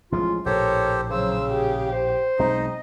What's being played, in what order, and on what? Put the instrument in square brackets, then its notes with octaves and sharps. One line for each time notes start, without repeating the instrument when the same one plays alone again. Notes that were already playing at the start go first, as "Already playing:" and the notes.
[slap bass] A1 F3 G#3 [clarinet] F4
[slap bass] A#1 A2 [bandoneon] G4 A4 C5 [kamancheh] A#4 [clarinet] C#5
[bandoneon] C#3 [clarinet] F#3 [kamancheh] C5 E6
[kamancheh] G4 [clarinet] G#4
[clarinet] C5
[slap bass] B1 G#3 C4 [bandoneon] D#4 [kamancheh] D#5